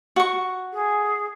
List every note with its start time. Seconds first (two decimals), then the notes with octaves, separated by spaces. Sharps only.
0.16 F#4 C#6
0.73 G#4